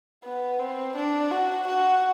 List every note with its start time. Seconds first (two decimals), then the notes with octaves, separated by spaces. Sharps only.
0.24 B3
0.59 C4
0.96 D4
1.32 F#4
1.68 F#4